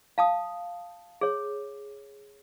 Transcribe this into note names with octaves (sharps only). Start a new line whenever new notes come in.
F5 A5 D#6
G#4 C#5